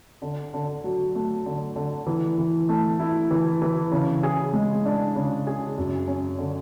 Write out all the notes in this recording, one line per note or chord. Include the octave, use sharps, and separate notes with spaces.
D3
D3
F#3
A3
D3
D3
E3
E3
A3
E4
E3
E3
C#3
G#4
G#3
D4
C#3
G#4
F#2
C#4
D3